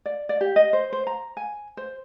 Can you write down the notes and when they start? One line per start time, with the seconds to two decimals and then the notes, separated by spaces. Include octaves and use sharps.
0.06 D5
0.29 D5
0.41 G4
0.56 D#5
0.73 C5
0.92 C5
1.07 A#5
1.37 G#5
1.77 C5